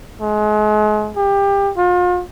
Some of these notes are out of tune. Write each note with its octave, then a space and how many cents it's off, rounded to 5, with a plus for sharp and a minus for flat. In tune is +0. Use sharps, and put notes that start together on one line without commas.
G#3 +35
G4 +25
F4 +40